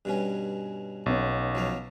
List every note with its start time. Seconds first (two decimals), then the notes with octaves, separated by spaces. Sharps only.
0.05 G2 B2 C#4
1.06 B1 B3 C#4 C#5
1.55 F3 F#3 F5